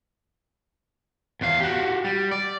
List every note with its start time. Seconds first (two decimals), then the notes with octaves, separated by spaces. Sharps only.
1.41 E2 F5
1.60 F#4 G4
2.04 G3
2.32 D5